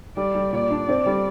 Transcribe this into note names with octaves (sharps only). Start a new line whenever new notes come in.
G3 D5
G3
A#2 D5
D4
C4
G3